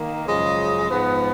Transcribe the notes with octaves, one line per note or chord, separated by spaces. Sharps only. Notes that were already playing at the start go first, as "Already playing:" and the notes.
Already playing: D#3 A#3
F#2 C#3 F3 G#3
G#2 F3 B3